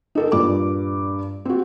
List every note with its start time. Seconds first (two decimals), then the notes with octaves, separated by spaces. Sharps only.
0.15 D#4 A4 A#4
0.32 G2 A#2 D6
1.45 C4 F#4